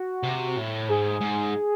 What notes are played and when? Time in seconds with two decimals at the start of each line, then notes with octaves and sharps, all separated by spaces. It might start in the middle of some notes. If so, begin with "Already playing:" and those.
Already playing: F#4
0.23 C3
0.57 A2
0.89 G#2 G#4
1.21 G#2